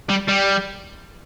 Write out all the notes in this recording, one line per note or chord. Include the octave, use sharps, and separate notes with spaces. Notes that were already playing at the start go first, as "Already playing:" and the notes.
G3
G3